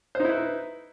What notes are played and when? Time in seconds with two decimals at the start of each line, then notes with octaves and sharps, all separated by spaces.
0.15 C5
0.20 D#4
0.25 E4
0.29 B4